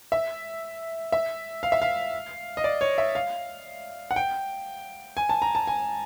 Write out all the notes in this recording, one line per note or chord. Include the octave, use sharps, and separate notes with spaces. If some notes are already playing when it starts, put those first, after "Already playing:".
E5
E5
F5
E5
F5
D#5
D5
C#5
E5
F5
F#5
G5
G#5
A5
A#5
A5
G#5